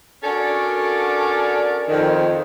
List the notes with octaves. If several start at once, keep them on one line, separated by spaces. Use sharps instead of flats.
C#4 D4 F#4 A4 A#4 D5
F2 D#3